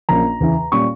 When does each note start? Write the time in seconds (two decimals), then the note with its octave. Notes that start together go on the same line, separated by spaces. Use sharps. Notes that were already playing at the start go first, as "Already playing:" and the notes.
0.09 A#1 A#2 A#3 C#4 A#5
0.40 E2 C#3 E3
0.72 A#2 G3 C#4 C#6